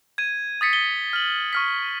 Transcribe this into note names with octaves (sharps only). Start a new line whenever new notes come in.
G#6 D#7
D#6 A6 B6 C#7
G7
F6 F#7
C#6 F6 B6